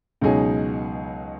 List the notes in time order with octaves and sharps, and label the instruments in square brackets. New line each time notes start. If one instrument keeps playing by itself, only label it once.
[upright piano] C#2 B2 F#3 D#4 G#4